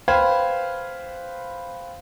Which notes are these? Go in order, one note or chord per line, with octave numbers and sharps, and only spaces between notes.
B4 C5 F5 G5 B5 G#6